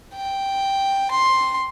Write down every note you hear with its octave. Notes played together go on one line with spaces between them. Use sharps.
G5
C6